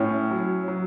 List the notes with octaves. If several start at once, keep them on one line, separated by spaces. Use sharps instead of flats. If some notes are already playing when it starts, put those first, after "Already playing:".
Already playing: A2 C#4
F#3
F#3